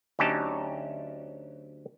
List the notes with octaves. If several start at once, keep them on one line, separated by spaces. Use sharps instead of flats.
D2 F#3 C#4 D#4 G4 A5